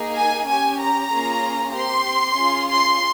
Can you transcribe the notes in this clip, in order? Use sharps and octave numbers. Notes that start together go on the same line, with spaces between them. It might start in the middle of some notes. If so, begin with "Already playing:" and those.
Already playing: A#3 D#4 G#4
G#5
C#4 G4 G#5
A#5
A#3 C#4 F4 G#4
C4 G4 C6
C#4 F4 G#4
C6